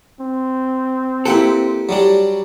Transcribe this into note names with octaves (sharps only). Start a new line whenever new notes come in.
C4
A#3 E4 G4 A4 F#5 G5
F#3 G3 D4